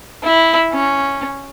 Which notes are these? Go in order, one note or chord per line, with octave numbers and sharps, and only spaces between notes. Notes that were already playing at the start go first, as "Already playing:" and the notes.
E4
C#4